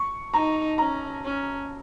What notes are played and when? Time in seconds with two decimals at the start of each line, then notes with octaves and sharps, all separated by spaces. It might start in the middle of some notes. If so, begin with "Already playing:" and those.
Already playing: C#6
0.34 D#4 A#5
0.78 C#4 A#5
1.25 C#4